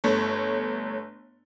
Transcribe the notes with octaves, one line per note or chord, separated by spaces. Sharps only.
G1 A3 C#5